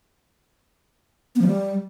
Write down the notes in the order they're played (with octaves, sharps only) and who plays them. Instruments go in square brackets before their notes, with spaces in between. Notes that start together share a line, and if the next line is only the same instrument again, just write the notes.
[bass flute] B3
F3
G3